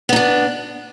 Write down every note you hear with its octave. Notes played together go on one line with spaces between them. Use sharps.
B3 D4 D#4